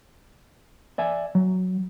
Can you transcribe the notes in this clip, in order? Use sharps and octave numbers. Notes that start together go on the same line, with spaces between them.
D5 E5 G#5
F#3